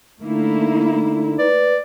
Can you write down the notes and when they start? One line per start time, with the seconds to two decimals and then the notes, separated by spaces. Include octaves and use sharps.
0.22 D3 A3 A#3 D#4 E4
1.39 B4 D5